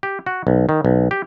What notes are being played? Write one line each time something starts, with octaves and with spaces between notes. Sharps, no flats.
G4
F#4
B1
D#3
B1
G4